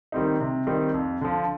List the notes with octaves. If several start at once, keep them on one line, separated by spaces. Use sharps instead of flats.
D#3 G3 C4 D#4
C3
D#3 G3 C4 D#4
F2
D3 F3